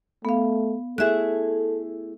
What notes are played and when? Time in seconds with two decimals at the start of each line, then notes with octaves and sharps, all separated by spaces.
0.25 A3 B3 F5
0.98 A3 E4 G#4 A4 E5 F#6